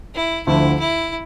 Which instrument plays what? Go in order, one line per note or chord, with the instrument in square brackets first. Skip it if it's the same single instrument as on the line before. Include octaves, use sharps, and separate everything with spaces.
[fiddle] E4
[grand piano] D2 D3 F3 [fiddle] E4
[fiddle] E4